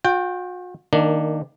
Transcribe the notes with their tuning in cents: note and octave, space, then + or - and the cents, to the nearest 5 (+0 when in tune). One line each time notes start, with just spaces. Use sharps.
F#4 -45 G5 +0
D#3 +0 A#3 -20 D4 +10